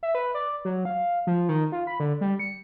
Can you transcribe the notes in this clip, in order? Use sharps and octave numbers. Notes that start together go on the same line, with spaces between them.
E5
B4
D5
F#3
F5
F3
D#3
F4
B5
D3
G3
C#7